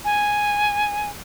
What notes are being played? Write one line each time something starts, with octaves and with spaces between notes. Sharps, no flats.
G#5